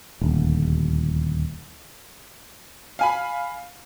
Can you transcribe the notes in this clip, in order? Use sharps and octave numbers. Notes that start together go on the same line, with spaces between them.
D#1 D2
F5 G#5 B5